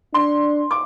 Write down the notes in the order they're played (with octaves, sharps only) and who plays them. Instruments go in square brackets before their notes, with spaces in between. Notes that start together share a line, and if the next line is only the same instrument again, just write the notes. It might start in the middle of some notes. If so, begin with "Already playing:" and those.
[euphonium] D4 [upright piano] C6
[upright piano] D6